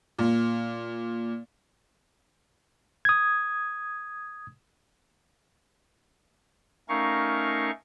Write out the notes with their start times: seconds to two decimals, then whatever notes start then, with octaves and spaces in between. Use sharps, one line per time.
0.18 A#2
3.05 D#6 G#6
6.89 A3 C#4 D#4 A#4 F5 C#6